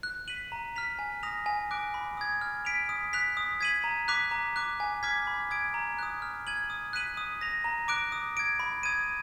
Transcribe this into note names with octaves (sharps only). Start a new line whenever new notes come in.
F#6
B6 D#7 F#7
A#5
F6 B6 F7
G#5
D#6 A#6 F7
G#5
D6 F#6 D7
B5
D#6 G#6
F6
B6 D7 F7
D#6
F#6 B6 F7
D#6
G#6 B6 D#7 F#7
A#5
D6 F#6 B6 F7
A#5
D6 F#6
G#5
D6 F6 G#6 B6
B5
D#6 G#6 D7
A#5
D#6 F#6
F6
G#6 D#7 F#7
D#6
F#6 B6 D#7 F#7
D#6
A#6 F7
A#5
D6 F#6 D7
D#6
G#6 D7
B5
D#6 G#6 D#7